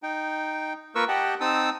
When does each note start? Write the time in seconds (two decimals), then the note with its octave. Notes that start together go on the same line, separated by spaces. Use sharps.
0.03 D#4 G5
0.95 A#3 F4 A#4 B4 C#6 E6
1.08 G4 D#5 F#5 G5 A5
1.41 C4 D#4 A5 D#6 E6